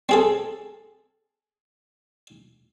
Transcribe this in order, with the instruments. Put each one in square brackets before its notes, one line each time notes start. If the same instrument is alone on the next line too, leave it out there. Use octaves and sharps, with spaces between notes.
[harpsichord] C4 G#4 A4